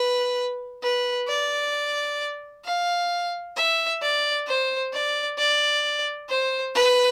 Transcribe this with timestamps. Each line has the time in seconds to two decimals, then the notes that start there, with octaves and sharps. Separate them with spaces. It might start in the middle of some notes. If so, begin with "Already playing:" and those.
Already playing: B4
0.83 B4
1.28 D5
2.65 F5
3.56 E5
4.02 D5
4.47 C5
4.93 D5
5.38 D5
6.29 C5
6.75 B4